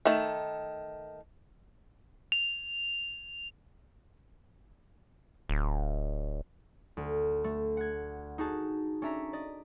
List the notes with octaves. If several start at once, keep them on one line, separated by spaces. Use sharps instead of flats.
D#3 A3
F7
D1
D2
A3
F#5 G#6
D#4 F#4 G#4 A5
C#4 D4 E5 A#5 B6
D5 D#5